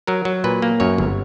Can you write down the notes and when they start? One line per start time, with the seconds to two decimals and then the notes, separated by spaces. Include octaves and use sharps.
0.07 F#3 A#4
0.25 F#3
0.44 A#2 B4
0.62 A#3
0.80 F#2 C#5
0.98 G1